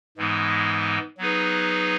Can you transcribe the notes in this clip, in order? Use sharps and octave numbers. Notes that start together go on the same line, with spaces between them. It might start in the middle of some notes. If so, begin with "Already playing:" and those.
G#2 E3 G#3 B3
F#3 B3 D#4 G#4 B4